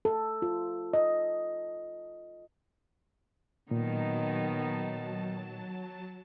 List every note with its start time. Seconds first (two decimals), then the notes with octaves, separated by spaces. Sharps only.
0.05 A4
0.42 F4
0.94 D#5
3.71 A#2 D#3 F#3 B3 D#4 A5